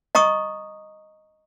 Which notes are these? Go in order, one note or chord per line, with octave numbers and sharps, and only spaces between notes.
D#5 A#5 C#6 D#6